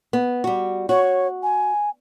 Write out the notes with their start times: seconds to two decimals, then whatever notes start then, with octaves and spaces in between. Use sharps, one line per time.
0.13 B3
0.44 G3 F#4
0.89 F#4 C#5
1.43 G#5